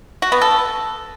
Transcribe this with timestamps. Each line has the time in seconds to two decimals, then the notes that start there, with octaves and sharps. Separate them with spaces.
0.22 F#4
0.32 B3
0.42 A4